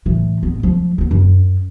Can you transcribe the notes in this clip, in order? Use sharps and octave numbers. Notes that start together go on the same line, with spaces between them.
A2 E3
A1 B3
F3
A#3 B3
F#2